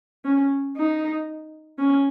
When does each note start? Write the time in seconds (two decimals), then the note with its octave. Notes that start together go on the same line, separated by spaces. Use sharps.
0.25 C#4
0.77 D#4
1.78 C#4